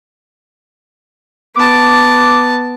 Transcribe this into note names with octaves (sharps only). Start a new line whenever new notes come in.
B3 A5 D6